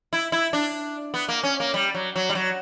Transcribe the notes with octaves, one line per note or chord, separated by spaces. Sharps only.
E4
E4
D4
B3
A#3
C#4
A#3
G3
F#3
F#3
G3
F#3